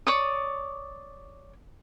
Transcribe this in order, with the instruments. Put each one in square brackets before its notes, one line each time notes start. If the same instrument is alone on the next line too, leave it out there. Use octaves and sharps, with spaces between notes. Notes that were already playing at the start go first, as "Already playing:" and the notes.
[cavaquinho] C#5 D5 D#6